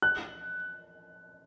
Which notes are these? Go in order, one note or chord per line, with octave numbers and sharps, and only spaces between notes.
F#6